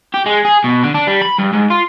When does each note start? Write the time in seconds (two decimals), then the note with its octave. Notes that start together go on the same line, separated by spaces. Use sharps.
0.14 G4
0.26 G#3
0.45 G#4
0.64 B2
0.83 D3
0.95 D4
1.07 G3
1.22 B5
1.39 G2
1.53 G#2
1.70 F4